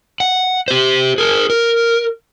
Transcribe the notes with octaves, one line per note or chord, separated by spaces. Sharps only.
F#5
G4 C5
G#4 A#4
A#4